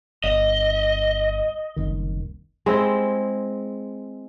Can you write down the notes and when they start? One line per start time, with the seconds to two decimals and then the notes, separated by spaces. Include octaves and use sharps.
0.24 G1 D#5
1.76 F#1 C2 D#3
2.66 G#3 C4 E4